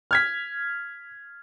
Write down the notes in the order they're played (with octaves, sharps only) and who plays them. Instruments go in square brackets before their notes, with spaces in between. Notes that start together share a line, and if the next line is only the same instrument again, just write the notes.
[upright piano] F6 G#6 B6